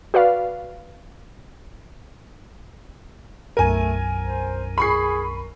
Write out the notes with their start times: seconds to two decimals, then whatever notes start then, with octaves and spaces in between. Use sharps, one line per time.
0.14 F#4 B4 D5 F5
3.57 B1 F#2 A3 A#4 G#5 D#7
4.21 C5
4.78 G#4 B5 C#6 C7